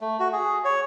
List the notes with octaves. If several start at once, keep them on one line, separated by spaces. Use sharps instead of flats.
A3
F#4
G#4
C#5